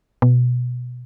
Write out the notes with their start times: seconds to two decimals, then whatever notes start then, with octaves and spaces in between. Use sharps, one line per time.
0.22 B2